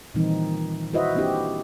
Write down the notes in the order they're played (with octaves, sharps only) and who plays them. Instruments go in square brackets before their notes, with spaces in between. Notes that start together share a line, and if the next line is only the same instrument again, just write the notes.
[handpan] A#2 D#3 E3 G3 C4 D#4
E4 F#4 B4 C5 D#5 E5
A#3 C4 D4 E4 G4